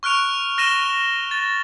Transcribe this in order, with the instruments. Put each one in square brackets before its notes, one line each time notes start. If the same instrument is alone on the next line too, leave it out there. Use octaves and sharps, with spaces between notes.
[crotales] C#6 F6 F#6 D7 F7
F6 A#6 D#7 E7 G7
A6